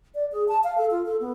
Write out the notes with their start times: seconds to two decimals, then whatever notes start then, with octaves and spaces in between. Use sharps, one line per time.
0.15 D5
0.32 G#4
0.48 A5
0.64 F5
0.78 A4
0.90 F4
1.05 A4
1.20 B3